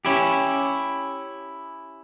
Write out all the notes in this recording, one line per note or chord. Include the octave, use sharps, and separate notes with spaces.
C#4 E4 G4